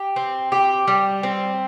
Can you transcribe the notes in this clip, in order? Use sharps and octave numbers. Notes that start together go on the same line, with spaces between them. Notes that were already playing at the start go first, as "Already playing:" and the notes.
Already playing: G4
C4
G4
G3
C4